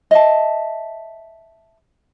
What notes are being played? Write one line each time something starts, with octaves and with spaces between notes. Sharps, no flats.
D#5 E5 A5